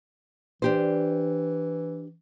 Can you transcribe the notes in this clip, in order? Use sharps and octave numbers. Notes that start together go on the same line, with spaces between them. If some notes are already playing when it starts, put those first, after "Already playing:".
E3 D4 G4 C5